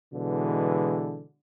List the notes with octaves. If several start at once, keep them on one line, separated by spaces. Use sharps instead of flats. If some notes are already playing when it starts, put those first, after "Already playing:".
B2 D3 E3 G#3